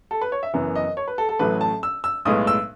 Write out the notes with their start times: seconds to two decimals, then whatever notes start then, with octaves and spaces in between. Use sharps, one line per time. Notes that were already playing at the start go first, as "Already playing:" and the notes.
0.11 A4
0.22 B4
0.32 C#5
0.43 E5
0.54 F#1 F#2 E3 B3
0.76 D#5
0.97 C#5
1.08 B4
1.18 A4
1.29 A4
1.39 A1 A2 F#3 A3 B4
1.61 A5
1.83 E6
2.04 E6
2.25 B1 A2 G#3 B3 D#6
2.47 E6